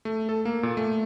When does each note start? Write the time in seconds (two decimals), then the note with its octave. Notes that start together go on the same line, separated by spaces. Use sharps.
0.05 A3
0.29 A4
0.45 A#3
0.63 A#2
0.77 A3